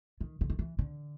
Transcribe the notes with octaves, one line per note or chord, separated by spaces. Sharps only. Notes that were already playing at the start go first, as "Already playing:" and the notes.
D#3
D3
D#3
E3
D3